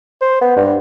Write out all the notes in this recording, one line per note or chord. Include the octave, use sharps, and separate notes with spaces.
C5
B3
G2